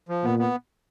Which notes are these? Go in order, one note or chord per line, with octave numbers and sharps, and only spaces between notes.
F3
A#2 B3
B3